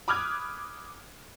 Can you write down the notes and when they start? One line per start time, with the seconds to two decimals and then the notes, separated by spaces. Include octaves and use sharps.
0.08 B5 D6 D#6 F6 F#6 G#6